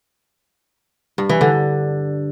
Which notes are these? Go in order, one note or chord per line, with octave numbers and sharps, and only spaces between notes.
G2
E3
D3